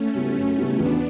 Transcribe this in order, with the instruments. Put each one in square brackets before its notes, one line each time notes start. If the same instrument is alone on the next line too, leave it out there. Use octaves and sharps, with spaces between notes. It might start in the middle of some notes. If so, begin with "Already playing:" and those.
Already playing: [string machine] A3 C#4
[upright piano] C#3 G3 B3 E4
F#2
C#3 G3 B3 E4
[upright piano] E2 [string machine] B3 D4